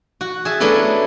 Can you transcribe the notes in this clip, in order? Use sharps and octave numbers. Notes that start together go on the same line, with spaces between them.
F#4
G#4 E5 A5
F#3 A3 B3 C#4 D4 E4